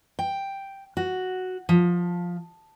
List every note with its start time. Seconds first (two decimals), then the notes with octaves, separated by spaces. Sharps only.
0.19 G5
0.97 F#4
1.69 F3